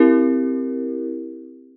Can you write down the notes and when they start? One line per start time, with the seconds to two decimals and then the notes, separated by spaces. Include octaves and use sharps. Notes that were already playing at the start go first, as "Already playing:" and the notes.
Already playing: C4 E4 G4 A#4